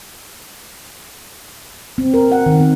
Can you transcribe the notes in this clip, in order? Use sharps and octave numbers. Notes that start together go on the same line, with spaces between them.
C4
A#4
F#5
D#3
C4